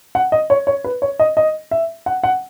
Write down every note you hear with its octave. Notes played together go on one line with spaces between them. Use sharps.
F#5
D#5
C#5
C#5
B4
C#5
D#5
D#5
E5
F#5
F#5